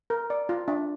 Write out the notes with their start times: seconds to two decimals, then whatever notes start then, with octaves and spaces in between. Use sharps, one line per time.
0.10 A#4
0.30 D5
0.49 F4
0.68 D4